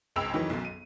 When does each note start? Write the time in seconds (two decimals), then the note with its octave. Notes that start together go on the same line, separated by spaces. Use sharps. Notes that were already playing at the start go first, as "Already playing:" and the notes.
0.16 G#1 C#2 G5 B5 E6 F7
0.33 F2 D#3 E3 F#3
0.50 B1 F#2
0.65 D#7